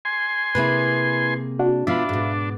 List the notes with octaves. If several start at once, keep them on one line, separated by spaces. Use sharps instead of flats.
G#5 C6
C3 A#3 E4 G#4 B4
D4 F#4
B2 B3 D4 F4 E5 F5 B5
G#2 B2